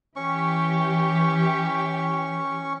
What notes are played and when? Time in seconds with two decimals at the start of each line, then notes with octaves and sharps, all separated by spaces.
0.16 E3 C#4 G4 C#6